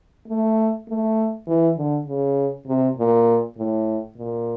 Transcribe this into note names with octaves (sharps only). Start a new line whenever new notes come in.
A3
A3
E3
D3
C#3
C3
A#2
A2
A#2